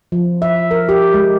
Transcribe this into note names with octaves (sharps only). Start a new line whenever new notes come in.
F3
E5
A#4
G4
G#3